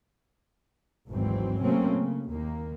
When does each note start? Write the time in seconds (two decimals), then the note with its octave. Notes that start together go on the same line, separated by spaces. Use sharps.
1.09 G#1 D2 G#2 E3 F#3 C4
1.63 C3 F#3 A3 A#3 C4 C#4
1.96 C#3
2.31 D#2 D#3 A#3